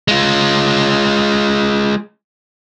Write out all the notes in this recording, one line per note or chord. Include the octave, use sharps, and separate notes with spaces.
G#3 F4